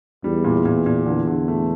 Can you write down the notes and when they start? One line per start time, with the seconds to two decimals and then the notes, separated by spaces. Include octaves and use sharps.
0.24 E2 G3
0.44 A#2
0.65 A#2
0.86 A#2
1.06 E2 D3
1.27 D3
1.48 A3